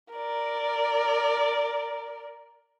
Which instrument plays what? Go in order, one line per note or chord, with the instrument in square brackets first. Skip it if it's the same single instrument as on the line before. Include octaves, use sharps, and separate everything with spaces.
[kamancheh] A#4 D5